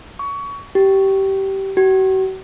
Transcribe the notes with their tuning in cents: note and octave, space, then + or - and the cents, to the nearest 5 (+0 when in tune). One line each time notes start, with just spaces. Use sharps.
C#6 +25
G4 -20
F#4 +45